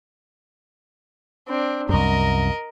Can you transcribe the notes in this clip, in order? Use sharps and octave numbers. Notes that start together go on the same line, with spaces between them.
C4 D4
C2 F#2 A#4 D#5